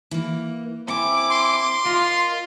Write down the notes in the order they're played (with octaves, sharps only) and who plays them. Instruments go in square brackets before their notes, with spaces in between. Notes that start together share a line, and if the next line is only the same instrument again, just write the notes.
[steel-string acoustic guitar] E3 A#3
[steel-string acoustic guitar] C4 G#5 [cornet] E4 [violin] D6
[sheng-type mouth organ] C6
[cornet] F4 [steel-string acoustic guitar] A#4 D#5 F5